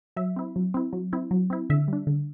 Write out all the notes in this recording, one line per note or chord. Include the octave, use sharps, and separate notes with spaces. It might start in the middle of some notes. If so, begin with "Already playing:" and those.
F#3 E5
C4 E4
F#3
C4 E4
F#3
C4 E4
F#3
C4 E4
D3 E5
G3 D4
D3